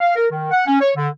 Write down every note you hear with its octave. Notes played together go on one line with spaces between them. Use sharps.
F5
A#4
D#3
F#5
C#4
C#5
D3